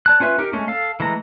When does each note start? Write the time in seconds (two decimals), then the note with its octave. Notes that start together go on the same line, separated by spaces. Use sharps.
0.06 D5 A5 F#6
0.20 C#4 F4 B4 E5 F#6
0.38 D#4 G4 A#4
0.53 G#3 A3 C#4
0.68 A4 F5
1.00 E3 G#3 A3 A#5